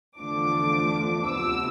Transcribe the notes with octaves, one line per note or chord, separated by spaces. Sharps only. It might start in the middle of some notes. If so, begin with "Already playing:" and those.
E2 D3 F3 A3 D4 D6
D2 C3 F3 B3 E6